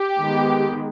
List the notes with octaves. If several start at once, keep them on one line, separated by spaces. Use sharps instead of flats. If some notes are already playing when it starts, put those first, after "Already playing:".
Already playing: G4
D#3 G#3 B3